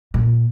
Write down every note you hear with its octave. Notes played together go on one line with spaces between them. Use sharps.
A#2